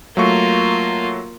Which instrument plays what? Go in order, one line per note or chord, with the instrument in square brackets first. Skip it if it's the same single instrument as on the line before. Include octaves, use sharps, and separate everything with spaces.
[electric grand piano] F#3 A3 C#6 [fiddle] A#3 F4